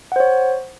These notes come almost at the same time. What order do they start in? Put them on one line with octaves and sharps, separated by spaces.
F#5 C5 C#5